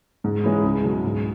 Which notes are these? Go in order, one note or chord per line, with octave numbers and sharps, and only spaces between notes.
G#2
E3 G#3 C#4 G#4
C#2
B2 F#3
G#2